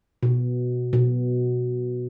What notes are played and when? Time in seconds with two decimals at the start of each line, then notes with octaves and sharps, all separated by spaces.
0.23 B2
0.93 B2